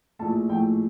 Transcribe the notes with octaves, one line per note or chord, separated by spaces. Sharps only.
A#1 A2 F3 A3 A5
A#1 A2 F3 A3 G5